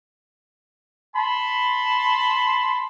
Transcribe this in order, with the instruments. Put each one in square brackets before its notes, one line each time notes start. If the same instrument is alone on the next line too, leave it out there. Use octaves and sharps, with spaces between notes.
[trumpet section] A5 B5 C6